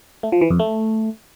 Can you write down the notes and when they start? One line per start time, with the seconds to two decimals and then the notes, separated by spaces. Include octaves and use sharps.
0.23 A3
0.32 F3
0.41 E3
0.50 F2
0.59 A3